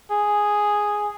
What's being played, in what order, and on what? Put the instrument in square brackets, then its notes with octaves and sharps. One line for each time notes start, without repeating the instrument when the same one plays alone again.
[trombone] G#4